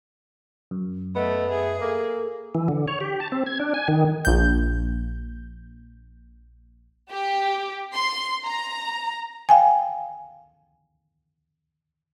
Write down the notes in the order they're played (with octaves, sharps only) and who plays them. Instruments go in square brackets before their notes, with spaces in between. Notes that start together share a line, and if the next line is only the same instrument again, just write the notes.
[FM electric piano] F#2
[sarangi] A3 [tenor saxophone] B3 [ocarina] D#5
[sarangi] G#4 [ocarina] E5
[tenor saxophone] A#3 [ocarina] A4
[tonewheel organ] E3
D3
C#5
G4
A5
C4
G#6
D4
G#5
D#3
[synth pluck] A#1 G6
[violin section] G4
C6
A#5
[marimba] F5 G5 G#5